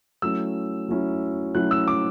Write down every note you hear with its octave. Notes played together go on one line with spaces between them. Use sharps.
F#3 A3 C#4 E4 E6
F#3 A3 C#4 E4
F#3 A3 C#4 E4 F#6
E6
D6